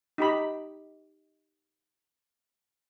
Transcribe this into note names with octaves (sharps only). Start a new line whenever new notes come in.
D#4 G4 B5